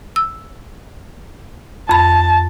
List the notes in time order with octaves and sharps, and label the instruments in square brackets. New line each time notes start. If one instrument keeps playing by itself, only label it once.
[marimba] E6
[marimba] F2 B5 [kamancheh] A5